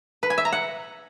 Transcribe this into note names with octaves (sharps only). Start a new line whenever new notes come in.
B4
G#5
E5
A#5
F#5